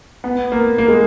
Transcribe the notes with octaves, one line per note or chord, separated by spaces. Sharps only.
B3
A#3
A#3
G#3